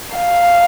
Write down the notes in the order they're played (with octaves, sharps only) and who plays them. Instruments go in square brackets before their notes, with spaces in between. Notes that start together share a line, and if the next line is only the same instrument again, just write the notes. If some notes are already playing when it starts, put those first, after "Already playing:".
[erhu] F5